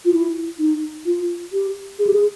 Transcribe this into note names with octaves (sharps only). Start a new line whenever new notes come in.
F4
E4
D#4
F4
G4
G#4
G4
G#4